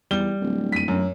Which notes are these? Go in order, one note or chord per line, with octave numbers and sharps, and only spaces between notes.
E2 G3 G7
D1
B6 D#7
F#2